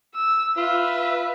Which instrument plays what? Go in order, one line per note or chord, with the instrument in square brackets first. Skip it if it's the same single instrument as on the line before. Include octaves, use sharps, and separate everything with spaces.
[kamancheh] E6
[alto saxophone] F4 [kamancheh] B4 E5